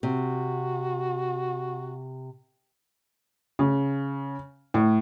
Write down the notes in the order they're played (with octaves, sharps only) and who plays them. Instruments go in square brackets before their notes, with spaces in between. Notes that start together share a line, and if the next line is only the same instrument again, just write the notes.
[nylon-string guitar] C3 [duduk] F#4
[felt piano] C#3
A2